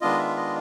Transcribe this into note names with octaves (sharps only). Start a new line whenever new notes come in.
D#3 G#3 B3 D4 F4 D#5
E5
D#5